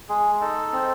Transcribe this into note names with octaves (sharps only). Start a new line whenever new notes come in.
G#3 G#4
D#4 A4
C4